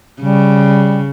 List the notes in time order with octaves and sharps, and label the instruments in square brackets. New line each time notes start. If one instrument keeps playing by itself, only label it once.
[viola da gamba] C#3 [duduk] G3